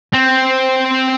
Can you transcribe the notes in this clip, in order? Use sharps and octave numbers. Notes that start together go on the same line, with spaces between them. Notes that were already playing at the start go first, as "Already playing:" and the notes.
C4